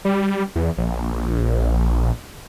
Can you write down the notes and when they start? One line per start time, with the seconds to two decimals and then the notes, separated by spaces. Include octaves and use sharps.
0.05 G3
0.55 E2
0.77 A#1